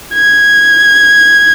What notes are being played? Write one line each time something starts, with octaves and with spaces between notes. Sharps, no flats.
G#6